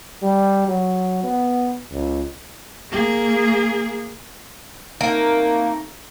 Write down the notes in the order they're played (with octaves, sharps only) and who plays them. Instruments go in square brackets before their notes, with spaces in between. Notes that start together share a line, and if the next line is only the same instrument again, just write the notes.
[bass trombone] G3
F#3
B3
C#2
[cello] A#3 G#4
[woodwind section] A3 C4 D#4 [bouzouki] A#3